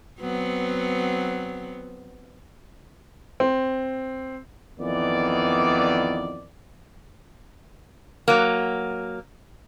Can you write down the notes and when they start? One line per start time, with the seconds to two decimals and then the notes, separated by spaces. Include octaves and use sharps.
0.21 F#3 B3 C4
3.40 C4
4.79 F2 D#3 E3 B3 D5
8.28 F#3 A#3